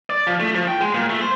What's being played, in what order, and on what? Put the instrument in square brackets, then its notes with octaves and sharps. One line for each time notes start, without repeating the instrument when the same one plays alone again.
[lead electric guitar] D5
F3
A3
F3
G5
G#3
A#2
A3
C5